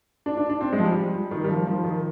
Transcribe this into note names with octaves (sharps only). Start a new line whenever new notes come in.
D4
D4
D4
C4
G#3
F3
G3
D#3
G3
F3
F3
D#3